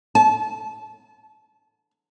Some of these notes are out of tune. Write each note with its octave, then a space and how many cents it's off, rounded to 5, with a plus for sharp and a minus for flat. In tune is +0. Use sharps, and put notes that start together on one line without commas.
A5 -30